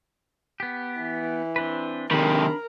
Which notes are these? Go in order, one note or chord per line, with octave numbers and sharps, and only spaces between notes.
B3 G4
E3
C4 D4 B4
C3 D#3 D4 A#4 B5